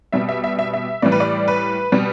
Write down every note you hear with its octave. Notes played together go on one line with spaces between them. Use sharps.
B2 G3 E5
E5
E5
E5
E5
A2 E3 G3 D5
B4
D5
B4
B2 G3